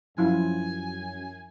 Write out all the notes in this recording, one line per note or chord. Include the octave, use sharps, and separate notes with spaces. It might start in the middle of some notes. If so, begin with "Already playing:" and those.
F#2 F3 E4 F4 G#5